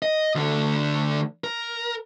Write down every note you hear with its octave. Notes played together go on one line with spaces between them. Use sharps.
D#5
D2 D3
A#4